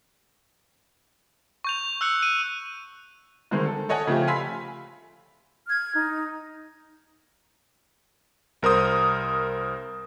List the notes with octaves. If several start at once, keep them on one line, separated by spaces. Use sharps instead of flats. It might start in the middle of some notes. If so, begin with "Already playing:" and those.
C#6 G6 F7
E6 F#6 C#7
D#7
D3 D#3 G#3 C5
A4
A4 C#5 D#5 F#5 G#5
C#3 F3 A3 F4 G4
F5 G#5 B5 C6 E6 B6
F6 G#6
D#4
C2 A#4 C5 D#6